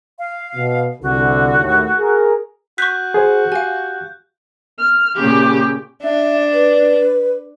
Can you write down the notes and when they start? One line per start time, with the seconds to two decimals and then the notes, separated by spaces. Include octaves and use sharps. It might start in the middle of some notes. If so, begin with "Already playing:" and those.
0.19 F5
0.55 B2
1.02 C2 D3 F#4
1.59 D#2 A2
1.99 G#4 A#4
2.78 F#4 C#6 F#6 G6 B6
3.14 G#4 C5
3.52 G4 F5 G#5
4.78 F6
5.18 A#2 C#3 G4
6.03 D4 E5
6.53 B4